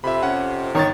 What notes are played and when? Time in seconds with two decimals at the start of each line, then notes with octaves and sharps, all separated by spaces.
0.04 F2 C3 E5 B5
0.23 C#4 F#5
0.75 G1 D#3 C#5 A6